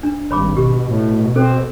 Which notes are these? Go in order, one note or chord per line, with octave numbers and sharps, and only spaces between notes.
D4
G#1 G2 C#5 B5 D6
B2 G4
A2
C4 G#4 A4 C5